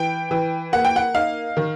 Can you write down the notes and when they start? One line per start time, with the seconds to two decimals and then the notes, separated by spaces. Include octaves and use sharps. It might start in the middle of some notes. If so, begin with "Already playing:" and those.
Already playing: E3 G5
0.31 E3
0.73 A#3 F#5
0.85 G5
0.96 F#5
1.14 D#4 F5
1.57 D#3